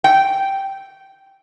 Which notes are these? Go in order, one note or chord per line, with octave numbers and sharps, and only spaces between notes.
G5